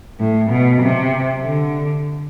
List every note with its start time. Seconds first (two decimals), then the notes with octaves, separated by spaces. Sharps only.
0.20 A2
0.50 B2
0.81 C3
1.43 D3